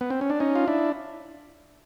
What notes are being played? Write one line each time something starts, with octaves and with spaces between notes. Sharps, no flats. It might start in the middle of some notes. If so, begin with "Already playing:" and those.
B3
C4
C#4
D4
C#4 D#4
F4
D4 E4